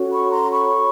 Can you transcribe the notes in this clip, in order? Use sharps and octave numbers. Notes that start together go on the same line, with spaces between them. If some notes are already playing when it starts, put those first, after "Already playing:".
Already playing: C#4 F#4 A4 C#5
B5 C#6
A#5 C6
B5 C#6